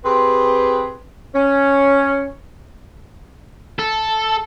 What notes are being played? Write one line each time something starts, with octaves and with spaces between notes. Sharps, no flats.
C4 G4 G#4 B4
C#4
A4